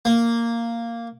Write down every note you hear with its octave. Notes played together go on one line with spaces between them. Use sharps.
A#3